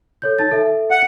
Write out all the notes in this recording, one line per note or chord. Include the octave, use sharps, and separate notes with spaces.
A4 C#5 G6
D#4 A5 A6
A4 E5
F#5